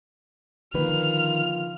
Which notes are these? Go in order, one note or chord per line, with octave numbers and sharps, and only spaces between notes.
D3 D#3 F3 A#3 F4 B4 F6